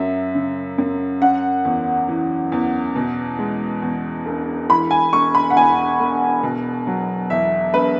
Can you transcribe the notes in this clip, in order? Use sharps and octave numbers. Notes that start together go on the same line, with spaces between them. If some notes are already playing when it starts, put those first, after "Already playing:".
Already playing: F#2 F#3 E5
C#3
F#2
C#4 F#5
E2
E3
E2
B2
G#3
E2
E1
E3 B5
G#5
E1 C#6
B5
F#5
E2 G#5
E1
B2
F#3
E2 E5
E1 B4